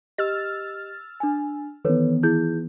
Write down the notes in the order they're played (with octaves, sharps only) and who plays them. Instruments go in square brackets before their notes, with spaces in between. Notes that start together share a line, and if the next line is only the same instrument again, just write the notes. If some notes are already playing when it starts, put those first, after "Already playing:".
[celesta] G4 D#5 [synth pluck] E6 F6 A6
[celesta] D4 G#5
[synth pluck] D#3 E3 B3 [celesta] A4 B4 C#5
[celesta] E4 G#4 G6